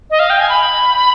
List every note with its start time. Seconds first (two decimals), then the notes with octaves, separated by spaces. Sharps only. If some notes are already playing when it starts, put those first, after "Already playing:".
0.10 D#5
0.19 F5
0.30 G5
0.40 G#5
0.49 B5